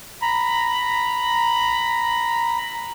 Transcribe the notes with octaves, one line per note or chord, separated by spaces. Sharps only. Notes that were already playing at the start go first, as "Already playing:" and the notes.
A#5 B5